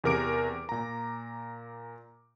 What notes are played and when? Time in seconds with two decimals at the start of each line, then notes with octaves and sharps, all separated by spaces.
0.04 E2 C3 A#4 D6 D7
0.69 A#2 A#5